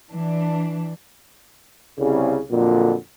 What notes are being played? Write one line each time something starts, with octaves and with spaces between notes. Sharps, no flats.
E3 D4
C2 C#3
F2 A#2 D3 F#3